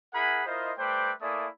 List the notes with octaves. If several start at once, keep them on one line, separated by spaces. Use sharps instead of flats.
E4 G#4 A#4 F#5 G#5 B5
E4 F4 A#4 C5 D#5
G3 A3 B4 C5 G5 D6
A3 A#3 E4 D5 G#5 D#6